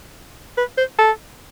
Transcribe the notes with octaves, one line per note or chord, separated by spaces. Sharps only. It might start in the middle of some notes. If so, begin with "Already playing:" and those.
B4
C5
A4